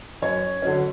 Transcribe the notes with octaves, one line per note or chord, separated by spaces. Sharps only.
F#2 C#5
D3 F#3 C#4